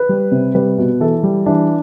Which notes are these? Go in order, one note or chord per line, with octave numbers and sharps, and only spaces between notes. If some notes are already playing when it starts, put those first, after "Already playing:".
Already playing: B4
G3
C3
G3 B4
B2
E3 A4
G3
E3 D4